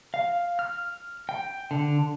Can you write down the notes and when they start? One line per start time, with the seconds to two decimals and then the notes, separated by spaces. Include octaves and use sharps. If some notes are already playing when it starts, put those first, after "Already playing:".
0.14 F5
0.59 F6
1.29 G5
1.71 D3